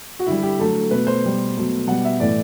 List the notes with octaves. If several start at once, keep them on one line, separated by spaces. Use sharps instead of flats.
F#4
D3 G3 E4
G4
D3 F#3 A3 A4
B2 A3 B4
C5
B2 G3
B2 F#3 A3
B2 G3 F#5
E5
A2 E3 A3 D5